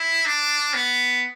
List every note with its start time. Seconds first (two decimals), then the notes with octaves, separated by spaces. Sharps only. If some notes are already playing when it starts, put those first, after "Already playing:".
Already playing: E4
0.26 D4
0.74 B3